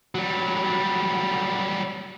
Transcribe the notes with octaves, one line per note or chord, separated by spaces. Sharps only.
F#3 G3